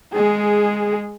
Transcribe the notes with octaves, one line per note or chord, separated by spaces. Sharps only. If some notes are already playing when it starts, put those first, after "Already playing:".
G#3 G#4